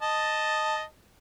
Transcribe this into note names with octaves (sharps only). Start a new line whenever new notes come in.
D#5 A5